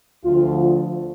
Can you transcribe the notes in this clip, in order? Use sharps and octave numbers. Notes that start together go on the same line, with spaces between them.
D2 D3 F3 F4